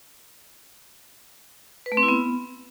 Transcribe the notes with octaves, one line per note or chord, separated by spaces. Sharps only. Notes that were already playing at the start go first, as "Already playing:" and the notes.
B4
A3
C4
E4
B3